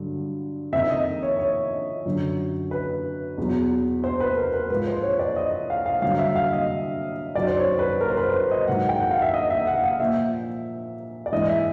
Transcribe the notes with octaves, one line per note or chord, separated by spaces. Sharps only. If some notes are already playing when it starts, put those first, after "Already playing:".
Already playing: G2 D3 F#3
F2 C3 D#3 E5
D#5
C#5
C#5
F#2 D3 F#3
B4
E2 B2 F#3
C5
B4
A#4
B4
G#2 F3 B4
C5
C#5
D5
D#5
F5
F5
G2 D3 F#3 F5
E5
F5
D#5
F#2 D#3 F#3 D5
C5
C#5
B4
A#4
C5
B4
C5
D#5
G#2 D#3 F#3 F#5
G5
F#5
F5
E5
D#5
E5
F#5
F5
A#2 F3 E5
D5
G#2 E3 D#5
E5